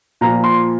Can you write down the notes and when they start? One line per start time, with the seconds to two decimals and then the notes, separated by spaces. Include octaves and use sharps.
0.21 A#2 F3 A#5
0.44 C6